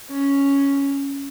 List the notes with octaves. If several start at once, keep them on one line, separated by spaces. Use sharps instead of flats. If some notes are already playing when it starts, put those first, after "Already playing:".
C#4